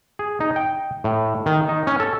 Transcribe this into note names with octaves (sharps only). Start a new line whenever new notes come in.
G#4
D#4
G5
A2
D#3
D#4
C#4
A4